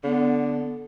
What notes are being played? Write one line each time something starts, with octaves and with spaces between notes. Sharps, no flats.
D3 B3